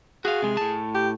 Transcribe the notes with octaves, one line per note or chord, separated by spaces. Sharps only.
F#4 G#4 F5
C3 G#3
A2 A5
G4